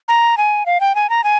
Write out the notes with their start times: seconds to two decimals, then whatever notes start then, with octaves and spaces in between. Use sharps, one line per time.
0.08 A#5
0.38 G#5
0.66 F5
0.81 G5
0.95 G#5
1.10 A#5
1.24 G#5